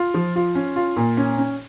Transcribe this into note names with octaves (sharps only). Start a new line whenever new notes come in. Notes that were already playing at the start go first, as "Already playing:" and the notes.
Already playing: F4
F3
F4
C#4
F4
A#2
C#4
C#4